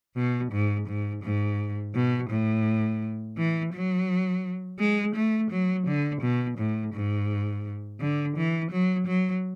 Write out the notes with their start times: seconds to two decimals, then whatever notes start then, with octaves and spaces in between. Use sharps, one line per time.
0.16 B2
0.52 G#2
0.87 G#2
1.23 G#2
1.95 B2
2.30 A2
3.37 E3
3.73 F#3
4.79 G#3
5.15 A3
5.51 F#3
5.87 D3
6.22 B2
6.58 A2
6.94 G#2
8.00 D3
8.37 E3
8.71 F#3
9.07 F#3